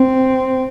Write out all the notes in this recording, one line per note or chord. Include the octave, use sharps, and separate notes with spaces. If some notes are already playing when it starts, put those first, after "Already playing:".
Already playing: C4